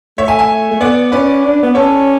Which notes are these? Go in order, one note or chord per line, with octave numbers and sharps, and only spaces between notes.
A3 C#5 E5
E5 G#5
E5 G#5
A3
B3 D5 F#5
C#4 B4 D5
D4
B3
C#4 A4 C#5